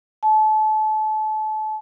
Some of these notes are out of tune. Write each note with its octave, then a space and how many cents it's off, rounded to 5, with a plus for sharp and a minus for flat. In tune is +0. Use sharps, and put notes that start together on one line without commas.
A5 -30